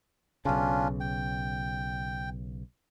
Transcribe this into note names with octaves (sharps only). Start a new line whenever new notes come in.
B1 C#3 C#4 D4 F4
G5